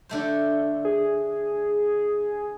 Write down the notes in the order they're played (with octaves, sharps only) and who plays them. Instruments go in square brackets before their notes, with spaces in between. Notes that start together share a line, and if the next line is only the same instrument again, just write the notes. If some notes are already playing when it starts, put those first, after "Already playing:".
[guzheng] D3 A3 C5
[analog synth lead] G#4